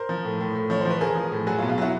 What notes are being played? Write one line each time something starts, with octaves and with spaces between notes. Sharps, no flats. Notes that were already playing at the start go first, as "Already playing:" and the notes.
Already playing: A#4 C5
F3
A2
A2
A2
F3 C#5
F3 C5
B4
F3 G#4 A#4
F3
A2
F#3 F#4 G#4
F4
B2
F4
F#3 E4 F#4